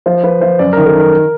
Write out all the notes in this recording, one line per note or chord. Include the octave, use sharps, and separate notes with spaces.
F3 C5
F3 B4
F3 C5
F#2 D5
A#4
D#3
A4
D#3 A#4